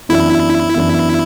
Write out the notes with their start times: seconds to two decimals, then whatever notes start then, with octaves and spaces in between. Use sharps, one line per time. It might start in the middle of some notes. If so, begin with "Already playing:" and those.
0.09 F#2 E3 B3 D4 E4
0.75 F#2 E3 B3 D4